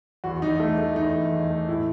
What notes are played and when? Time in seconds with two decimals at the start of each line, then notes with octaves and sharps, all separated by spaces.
0.24 E2 F#4
0.42 E2 D#4
0.60 A3
0.78 A3
0.95 E2 D#4
1.14 E2
1.32 E2
1.50 A3
1.69 A2 E4